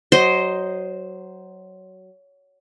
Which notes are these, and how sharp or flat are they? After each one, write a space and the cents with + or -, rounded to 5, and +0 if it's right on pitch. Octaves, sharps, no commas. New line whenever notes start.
F#3 +15 C5 +0 D#5 +0